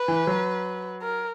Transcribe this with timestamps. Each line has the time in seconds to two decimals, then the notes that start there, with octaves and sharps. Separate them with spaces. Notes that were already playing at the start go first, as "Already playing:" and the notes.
Already playing: B4
0.08 E3
0.27 F#3
1.02 A#4